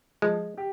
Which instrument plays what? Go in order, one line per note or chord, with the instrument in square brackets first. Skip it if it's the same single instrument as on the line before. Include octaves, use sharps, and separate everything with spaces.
[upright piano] F3 [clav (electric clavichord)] G#3
[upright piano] G4